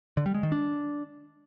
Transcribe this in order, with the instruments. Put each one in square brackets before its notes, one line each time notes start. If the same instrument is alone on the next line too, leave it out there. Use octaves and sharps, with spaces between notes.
[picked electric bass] D3
G3
G#3
D#3
D4